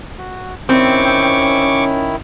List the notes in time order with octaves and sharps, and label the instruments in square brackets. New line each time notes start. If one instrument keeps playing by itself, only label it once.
[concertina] F#4
[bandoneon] D#3 E4 [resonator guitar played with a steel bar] C4 [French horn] C#4 [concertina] C#6 D6